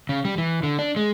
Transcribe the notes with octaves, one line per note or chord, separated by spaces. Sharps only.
C#3
G3
E3
D3
D4
G#3